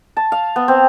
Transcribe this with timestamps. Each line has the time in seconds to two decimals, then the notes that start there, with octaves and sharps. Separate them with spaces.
0.17 A5
0.32 F5
0.56 B3
0.68 C4